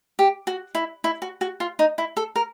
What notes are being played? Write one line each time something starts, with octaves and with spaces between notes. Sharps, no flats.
G4
F#4
E4
E4
F#4
F#4
F4
D#4
E4
A4
A#4